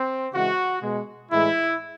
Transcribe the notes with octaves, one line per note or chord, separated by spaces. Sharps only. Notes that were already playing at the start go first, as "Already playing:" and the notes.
Already playing: C4
C#3 E3 G#3 F#4
B2 G#3
A2 E3 G#3 E4